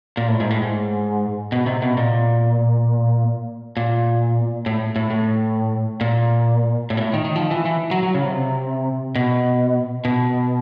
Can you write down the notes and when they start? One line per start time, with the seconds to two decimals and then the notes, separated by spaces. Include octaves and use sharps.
0.17 A#2
0.28 A2
0.40 G#2
0.50 A2
0.62 G#2
1.52 B2
1.66 C3
1.82 B2
1.97 A#2
3.77 A#2
4.66 A2
4.96 A2
5.10 A2
6.01 A#2
6.90 A2
6.97 A#2
7.01 A2
7.14 D#3
7.25 D#3
7.36 F3
7.51 E3
7.65 E3
7.91 F#3
8.03 F#3
8.15 C#3
8.25 C3
9.16 B2
10.05 B2